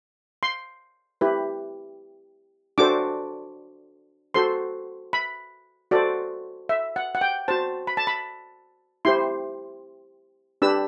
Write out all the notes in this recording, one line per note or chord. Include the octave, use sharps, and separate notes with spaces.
C6
E4 G4 B4
D4 F#4 A4 C5 D6
F#4 A4 C5 C6
B5
F#4 A4 C5 D5
E5
F#5
F#5
G5
F#4 C5 A5
B5
A5
B5
E4 G4 C5 C6
D4 G4 B4 E6